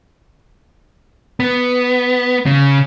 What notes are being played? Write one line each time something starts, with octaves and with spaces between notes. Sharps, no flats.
B3
C#3